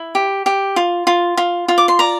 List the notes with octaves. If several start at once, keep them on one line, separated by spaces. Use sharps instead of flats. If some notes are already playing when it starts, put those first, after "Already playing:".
Already playing: E4
G4
G4
F4
F4
F4
F4
D6
C6
D5 A#5